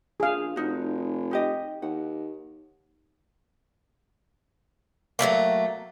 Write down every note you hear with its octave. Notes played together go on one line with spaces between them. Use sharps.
A#1 G#4 F5
F1 D#4 F#4
D#4 G4 D#5
D#2 F#5
F#3 G3 A3 A#3